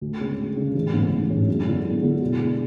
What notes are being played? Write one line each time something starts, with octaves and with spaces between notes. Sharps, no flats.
D2
C#3 G#3 C#4
D2
C#3 G#3 C#4
A1
G#2 G#3 C#4
A1
G#2 G#3 C#4
F#2
D3 G#3 B3 E4
F#2
D3 G#3 B3 E4
B2
G#3 D4 G#4